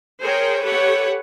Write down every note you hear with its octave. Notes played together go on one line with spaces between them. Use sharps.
G#4 A#4 C5 C#5 G5
G4 A4 B4 C#5 F#5